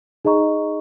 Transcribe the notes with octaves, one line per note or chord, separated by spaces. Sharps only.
D#4 G#4 D#5 A#5 C#6